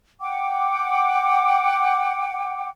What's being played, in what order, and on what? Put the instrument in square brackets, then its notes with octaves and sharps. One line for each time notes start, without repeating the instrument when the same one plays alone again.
[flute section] F#5 G5 D6